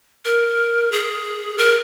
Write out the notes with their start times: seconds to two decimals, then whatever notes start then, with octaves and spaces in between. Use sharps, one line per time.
0.25 A#4
0.92 G#4
1.58 A#4